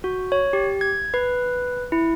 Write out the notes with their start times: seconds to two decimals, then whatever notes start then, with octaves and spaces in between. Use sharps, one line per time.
0.04 F#4
0.32 C#5
0.53 G4
0.81 G#6
1.14 B4
1.92 E4